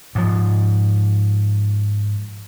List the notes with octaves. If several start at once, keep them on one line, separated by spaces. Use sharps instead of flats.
G#2 F3